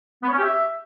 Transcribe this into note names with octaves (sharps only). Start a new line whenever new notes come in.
B3
C#5
C#4
G4
E5